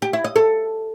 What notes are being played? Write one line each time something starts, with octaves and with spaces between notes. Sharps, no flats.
G4
E4
D#5
A4